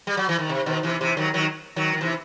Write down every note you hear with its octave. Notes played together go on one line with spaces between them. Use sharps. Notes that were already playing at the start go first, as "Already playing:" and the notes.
G3
F#3
E3
D#3
C3
B2 D#3
C3 E3
C3 E3
D#3 F#3
D#3 F#3
D#3 F#3
D#3
C3 E3